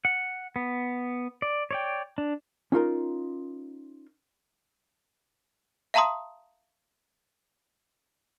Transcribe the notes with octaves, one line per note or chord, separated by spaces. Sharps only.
F#5
B3
D5
C#5 D5 G5
D4
C#4 D#4 F4 A#4
E5 F5 A5 A#5 C6 D#6